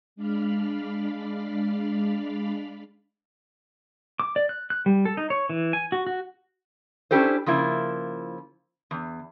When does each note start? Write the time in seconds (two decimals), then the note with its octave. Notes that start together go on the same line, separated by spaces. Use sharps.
0.16 G#3 D4 D5 F5 B5 F6
4.20 D6
4.36 D5
4.49 F#6
4.70 F#6
4.86 G3
5.05 A4
5.17 D#4
5.30 C#5
5.49 E3
5.73 G#5
5.92 F#4
6.07 F#4
7.11 C#4 D4 E4 G4 A4 C5
7.46 C#3 F3 A#3 E4
8.91 E2